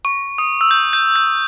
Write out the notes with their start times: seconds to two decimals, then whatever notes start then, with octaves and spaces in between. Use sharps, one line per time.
0.05 C#6
0.38 D#6
0.61 E6
0.71 G6
0.93 G6
1.16 G6